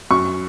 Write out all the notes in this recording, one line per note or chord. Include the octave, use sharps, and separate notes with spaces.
F#2 C#6